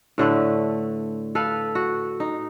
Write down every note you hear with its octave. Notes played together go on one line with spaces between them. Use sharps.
A2 D3 A3 B4
A4 B4 F5
F#4
D#4